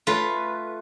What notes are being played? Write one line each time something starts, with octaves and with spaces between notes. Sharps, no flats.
A3 F4 B4